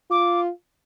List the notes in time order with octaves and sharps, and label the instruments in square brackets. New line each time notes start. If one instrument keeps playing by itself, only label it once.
[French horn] F4 [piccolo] D6